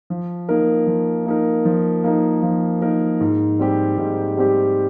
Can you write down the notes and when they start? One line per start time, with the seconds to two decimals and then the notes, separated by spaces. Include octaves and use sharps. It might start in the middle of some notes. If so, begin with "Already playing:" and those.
0.10 F3
0.49 A#3 D#4 A#4
0.87 F3
1.26 A#3 D#4 A#4
1.65 F3
2.04 A#3 D#4 A#4
2.42 F3
2.82 A#3 D#4 A#4
3.21 G#2
3.59 G3 C4 G4
3.98 G#2
4.37 G3 C4 G4